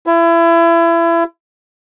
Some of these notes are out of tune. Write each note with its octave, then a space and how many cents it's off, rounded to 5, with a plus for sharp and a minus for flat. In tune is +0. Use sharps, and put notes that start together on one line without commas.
E4 +30